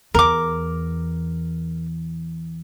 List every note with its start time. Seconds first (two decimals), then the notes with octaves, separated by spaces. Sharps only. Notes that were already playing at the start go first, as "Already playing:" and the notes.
0.14 E2 A#4 D6